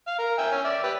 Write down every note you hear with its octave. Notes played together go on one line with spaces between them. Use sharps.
F5
A#4
E5 G5 G#5
C#4
D5 E5
G4 B4